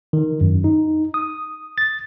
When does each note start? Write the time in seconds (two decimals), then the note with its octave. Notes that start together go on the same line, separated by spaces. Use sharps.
0.13 D#3
0.41 F#2
0.64 D#4
1.14 D#6
1.78 A6